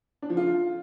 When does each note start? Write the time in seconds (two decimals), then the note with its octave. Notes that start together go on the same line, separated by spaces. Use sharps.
0.22 D4
0.30 F3
0.37 F4